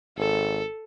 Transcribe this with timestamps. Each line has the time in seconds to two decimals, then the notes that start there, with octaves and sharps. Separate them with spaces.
0.17 G#1 A4